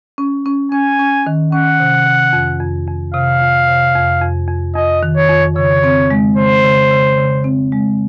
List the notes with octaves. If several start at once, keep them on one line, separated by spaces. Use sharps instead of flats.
C#4
C#4
C#4 G#5
C#4
D#3
C#4 F#5
C3
C3
F2
F2
F2
C3 F5
F2
C3
F2
F2
F2
F2 D#5
D#3
C#5
F2
C#3 C#5
C4
G#3
C#3 C5
C#3
C#3
C#3
C4
G#3